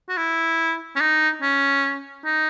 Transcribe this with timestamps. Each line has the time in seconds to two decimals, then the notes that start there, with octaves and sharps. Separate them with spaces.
0.09 F#4
0.17 E4
0.96 C#4
1.00 D#4
1.42 C#4
2.25 D#4